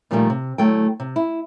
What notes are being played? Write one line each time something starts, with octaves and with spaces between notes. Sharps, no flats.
A#2 D3 D#3 F3 G3 A3
C3
D2 F#3 A3 E4 G5
C3
E4